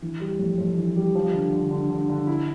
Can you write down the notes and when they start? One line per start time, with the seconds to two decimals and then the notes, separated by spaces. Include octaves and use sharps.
0.02 E3
0.20 G3
0.39 F2
0.58 F2
0.77 E3
0.96 G3
1.15 F3
1.33 D3
1.52 D3
1.71 D3
1.90 D3
2.09 D3
2.27 E4